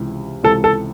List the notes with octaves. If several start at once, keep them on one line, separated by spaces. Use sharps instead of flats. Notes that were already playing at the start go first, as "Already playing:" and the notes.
Already playing: C#2 C3 E3
C#2 C3 E3 A4
A4